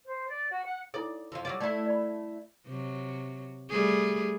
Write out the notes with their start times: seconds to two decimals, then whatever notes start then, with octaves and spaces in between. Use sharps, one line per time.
0.05 C5
0.30 D5
0.50 F#4
0.63 F#5
0.94 D#4 E4 A4 D5
1.32 F2 F3
1.45 F#3 G3 D5
1.60 A3 E4 D5
1.86 D5 B5
2.67 C3 F#3
3.70 G3 A3 G#4